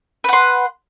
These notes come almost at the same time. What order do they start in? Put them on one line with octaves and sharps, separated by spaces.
B4 F#5 C6